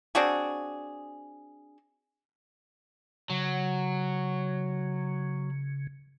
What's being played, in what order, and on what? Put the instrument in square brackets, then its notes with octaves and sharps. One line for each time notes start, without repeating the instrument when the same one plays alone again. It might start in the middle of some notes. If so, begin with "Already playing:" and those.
[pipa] C4 D4 F#4 G#4
[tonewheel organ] C#3 [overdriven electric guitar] F#3